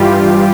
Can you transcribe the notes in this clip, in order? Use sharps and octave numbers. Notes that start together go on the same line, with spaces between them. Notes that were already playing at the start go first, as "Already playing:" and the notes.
Already playing: G2 E3 G3 F4 G4